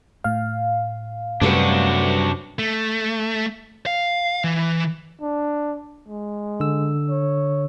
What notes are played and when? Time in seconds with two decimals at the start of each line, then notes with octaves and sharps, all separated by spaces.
0.24 A2 F5
1.41 F#2 C3 G3 A3 D4 F#4 B4
2.59 A3
3.86 F5
4.44 E3
5.21 D4
6.08 G#3
6.60 D3 E6
7.10 C#5